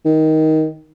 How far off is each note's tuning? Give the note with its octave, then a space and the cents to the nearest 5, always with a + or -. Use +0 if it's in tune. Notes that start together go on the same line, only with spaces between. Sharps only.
D#3 +15